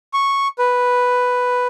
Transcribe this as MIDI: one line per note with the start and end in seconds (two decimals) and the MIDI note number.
0.14 0.48 85
0.59 1.67 71